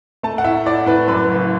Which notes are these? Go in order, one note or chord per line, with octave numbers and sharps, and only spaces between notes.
A3 A5
F#5
A2 E5
E4 D5
A2 B4
F#2 B4
F#1